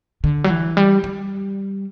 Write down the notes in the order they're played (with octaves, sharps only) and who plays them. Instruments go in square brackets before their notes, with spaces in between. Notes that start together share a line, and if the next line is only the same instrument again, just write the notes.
[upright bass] D3
F#3
E3
G3
G3